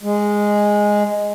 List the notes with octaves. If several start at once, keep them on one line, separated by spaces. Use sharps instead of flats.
G#3